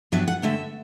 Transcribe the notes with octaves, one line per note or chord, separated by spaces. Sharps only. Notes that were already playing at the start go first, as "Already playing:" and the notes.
G2 F#3 B3 D4 E5
F#5
G2 D3 A3 E5